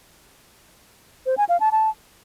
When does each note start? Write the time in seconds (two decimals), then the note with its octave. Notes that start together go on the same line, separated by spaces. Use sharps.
1.26 C5
1.38 G#5
1.49 F5
1.60 A5
1.72 A5